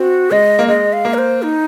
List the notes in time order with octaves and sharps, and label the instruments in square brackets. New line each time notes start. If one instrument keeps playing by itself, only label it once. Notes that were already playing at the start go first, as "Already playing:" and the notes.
Already playing: [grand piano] C4 [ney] F#4
[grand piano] G#3 [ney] D#5
[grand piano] A#3
[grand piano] G#3 [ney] D#5
[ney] F5
[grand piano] A#3
[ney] A#4
C5
D#4